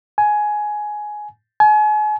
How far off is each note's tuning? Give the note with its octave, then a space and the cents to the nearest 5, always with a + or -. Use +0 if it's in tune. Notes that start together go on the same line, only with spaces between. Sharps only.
G#5 +15
G#5 +40